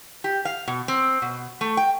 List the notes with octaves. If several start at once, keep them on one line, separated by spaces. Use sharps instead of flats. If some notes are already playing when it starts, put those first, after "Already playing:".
G4
F5
B2
C4
B2
A3
G5